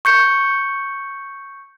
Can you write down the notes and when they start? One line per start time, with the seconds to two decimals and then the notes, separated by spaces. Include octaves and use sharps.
0.05 C#6 G6 C#7